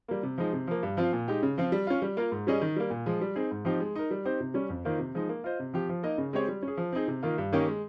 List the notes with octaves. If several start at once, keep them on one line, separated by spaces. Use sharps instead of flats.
G3 A#3
C3
F3 G#3 D#4
C3
F3 A#3
G2
F3 C4 F4
A#2
G#3 D#4 G4
C#3
F3 C4 F4
G3
C#4 F4
G3
A#3 F4 A#4
G#2
G3 C#4 G#4 D#5
D#3
G3 A#3
A#2
F3 G#3
G3
C4 D#4 G#4
G#2
F3 C4 D#4 G4
G#3
D#4 A#4
G3
C4 D#4 G4 C5
C3
G3 C#4
F2
D#3 A#3 F4 C5
C3
F3 G#3 D#4
A#3
F4 C5 D#5
C3
F3 C4 G4
F3
A#3 D#4 A#4 D#5
C#3
G#3 C4 G4 C#5
G3
C#4
G#4
F3
C4 D#4 G#4
C3
D#3 A#3 F4
G2
D#3 A#3 C#4 G4
G#3